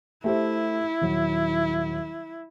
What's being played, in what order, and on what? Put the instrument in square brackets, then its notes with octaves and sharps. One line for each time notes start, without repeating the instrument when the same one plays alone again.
[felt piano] A3 G4 C5 [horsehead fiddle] E4
[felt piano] D#1 F#3